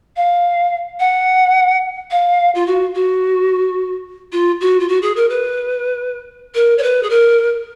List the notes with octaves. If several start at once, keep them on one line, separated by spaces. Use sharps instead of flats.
F5
F#5
F5
F4
F#4
F#4
F4
F#4
F4
F#4
G#4
A#4
B4
A#4
C#5
B4
G#4
A#4